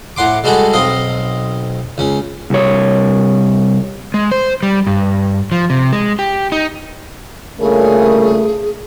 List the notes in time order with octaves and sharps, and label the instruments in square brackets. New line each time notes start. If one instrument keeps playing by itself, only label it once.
[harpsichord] A2 F#5 C6 D6
G3 G#3 F#4 G#4 A4
B1 C4 D#5 F5
C#2 C#4
[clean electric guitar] C2 C#5
[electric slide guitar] G#3
C5
G3
G2
F3
C3
G#3
G4
D#4
[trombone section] G2 A#2 C#3 [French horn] A3 [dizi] G#4 [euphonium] A#4